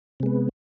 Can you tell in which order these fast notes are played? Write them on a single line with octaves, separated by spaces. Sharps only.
C3 G#3 B3